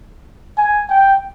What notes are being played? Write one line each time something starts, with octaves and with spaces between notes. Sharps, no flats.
G#5
G5